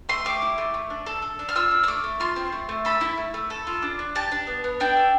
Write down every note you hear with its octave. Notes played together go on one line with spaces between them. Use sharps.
A3 C6
G4 D6
E4
A3
A3
D4
A4
A4
D4
F6
F4 E6
D4
E6
A3 D6
A3
F4 C6
C4
A3
A3
A4 B5
E4
A3
A3
A4
F4
D4
D4
G4 A5
D4
B3
B3
D4 G5
A4